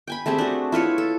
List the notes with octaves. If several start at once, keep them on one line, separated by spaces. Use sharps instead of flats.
G5 G#5 B5
A3 C4 G4 G#4
D4 F#4
E4 F4 B4 C#5
A4